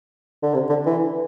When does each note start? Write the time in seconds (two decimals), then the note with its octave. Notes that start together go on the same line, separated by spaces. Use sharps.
0.42 D3
0.54 C3
0.69 D3
0.86 E3